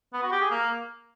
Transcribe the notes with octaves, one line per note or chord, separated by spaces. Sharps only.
B3
F#4
G4
G#4
A#3